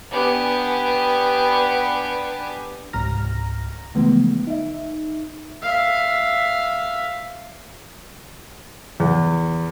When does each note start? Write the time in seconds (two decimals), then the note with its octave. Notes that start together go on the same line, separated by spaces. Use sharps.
0.11 B3 D4 G4 G#5
2.93 C#2 G#2 C3 A#5 F6 A#6
3.95 C#3 E3 F3 G#3 A3 B3
4.47 D#4 E5
5.63 E5 F5
9.00 E2